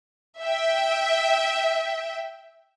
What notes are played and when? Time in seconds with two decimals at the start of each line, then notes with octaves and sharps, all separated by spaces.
0.42 E5 G5